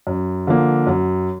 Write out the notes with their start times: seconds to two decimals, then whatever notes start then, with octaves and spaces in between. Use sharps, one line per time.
0.07 F#2
0.47 D3 F3 A#3
0.87 F#2